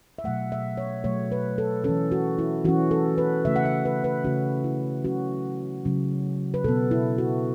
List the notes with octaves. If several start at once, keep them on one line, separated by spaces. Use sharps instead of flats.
E5
B2 F#3 A3 F#5
E5
C#5
B2 F#3 A3 C#5
B4
A4
E3 C#4 A4
F#4
E4
E3 C#4 F#4
A4
B4
C#3 A3 C#4 E5
F#5
E5
B4
B4
C#3 A3 C#4 F#4
E4
C#3 F#3 C#4 F#4
C#3 F#3 C#4
B4
B2 B3 A4
E4
F#4